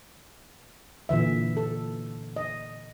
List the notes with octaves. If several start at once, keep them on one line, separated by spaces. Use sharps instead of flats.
A#2 D3 E3 E5
A4
D#5